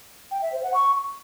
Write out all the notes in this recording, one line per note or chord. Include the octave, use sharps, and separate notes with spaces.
G5
E5
C5
F#5
C#6